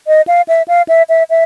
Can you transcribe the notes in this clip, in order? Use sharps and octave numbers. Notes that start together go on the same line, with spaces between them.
D#5
F5
E5
F5
E5
E5
E5